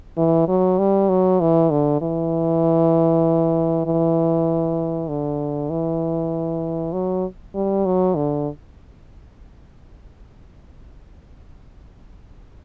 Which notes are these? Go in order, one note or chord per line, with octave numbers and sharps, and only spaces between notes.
E3
F#3
G3
F#3
E3
D3
E3
E3
D3
E3
F#3
G3
F#3
D3